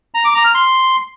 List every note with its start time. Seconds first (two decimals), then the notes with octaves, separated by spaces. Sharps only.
0.14 A#5
0.24 D6
0.34 A#5
0.45 F6
0.55 C6